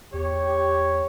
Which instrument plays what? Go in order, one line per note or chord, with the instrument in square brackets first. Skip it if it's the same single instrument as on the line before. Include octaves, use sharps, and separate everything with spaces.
[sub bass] E2 [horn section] G4 C#5